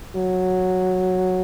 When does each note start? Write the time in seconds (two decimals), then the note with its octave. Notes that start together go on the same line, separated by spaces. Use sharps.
0.16 F#3